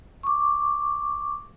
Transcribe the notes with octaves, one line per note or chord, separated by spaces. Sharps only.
C#6 D6